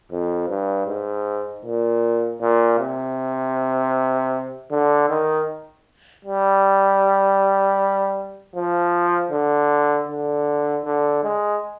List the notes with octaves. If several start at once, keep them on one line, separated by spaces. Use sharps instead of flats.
F2
G2
G#2
A#2
A#2
C3
D3
D#3
G3
F3
D3
D3
D3
G#3